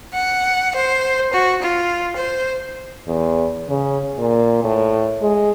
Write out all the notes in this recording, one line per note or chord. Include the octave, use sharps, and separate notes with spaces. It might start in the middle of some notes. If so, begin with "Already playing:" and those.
F#5
C5
F#4
F4
C5
E2
C#3
A#2
A2
G#3